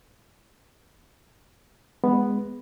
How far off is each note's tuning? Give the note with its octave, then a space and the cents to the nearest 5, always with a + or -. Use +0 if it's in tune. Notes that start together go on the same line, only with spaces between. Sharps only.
G#3 -10 B3 +0